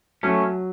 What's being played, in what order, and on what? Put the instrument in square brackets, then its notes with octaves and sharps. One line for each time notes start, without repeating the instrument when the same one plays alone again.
[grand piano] F#3 [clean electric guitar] A3 C#4